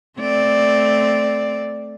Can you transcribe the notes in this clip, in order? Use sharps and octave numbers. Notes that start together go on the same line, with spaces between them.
A3 C4 D5